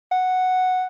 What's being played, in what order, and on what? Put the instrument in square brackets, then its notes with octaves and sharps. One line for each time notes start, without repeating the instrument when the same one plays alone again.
[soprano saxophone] F#5